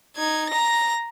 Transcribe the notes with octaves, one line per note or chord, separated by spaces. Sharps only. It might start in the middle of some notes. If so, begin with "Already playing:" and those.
D#4 G#6
A#5 A#6